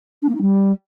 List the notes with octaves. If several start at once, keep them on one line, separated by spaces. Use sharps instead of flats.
D4
A#3
D#4
G3